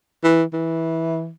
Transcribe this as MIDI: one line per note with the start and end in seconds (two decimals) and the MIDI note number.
0.24 0.44 52
0.53 1.31 52